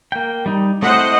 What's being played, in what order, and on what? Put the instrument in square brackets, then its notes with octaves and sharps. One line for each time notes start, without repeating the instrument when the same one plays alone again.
[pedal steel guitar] A#3 G5
G3 D#4
[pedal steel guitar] A3 C4 E4 [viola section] C5 D#5 F#5